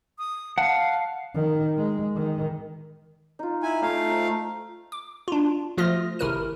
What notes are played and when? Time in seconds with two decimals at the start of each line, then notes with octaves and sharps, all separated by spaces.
0.19 D#6
0.58 F5 F#5 A5
1.34 D#3
1.77 G#3
2.15 D#3
3.39 D#4 F4
3.63 E4 G#5
3.82 A3 D#4 F5
4.10 D#4 C5
4.92 D6
5.28 D4 F4
5.78 F3 A3 F4 D#6 F6 A#6
6.19 G#1 C3 E4 A#4 F6 D#7